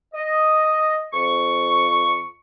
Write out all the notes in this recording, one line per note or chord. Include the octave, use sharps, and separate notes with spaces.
D#5
F2 C#6